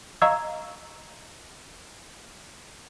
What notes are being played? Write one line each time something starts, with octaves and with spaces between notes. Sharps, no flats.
D#5 F5 A#5 C#6 E6 G#6